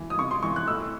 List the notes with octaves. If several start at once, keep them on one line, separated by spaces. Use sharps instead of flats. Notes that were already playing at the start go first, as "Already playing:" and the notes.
Already playing: E3
D#6
C3 C#6
C6
E3 C#6
F#6
A2 E6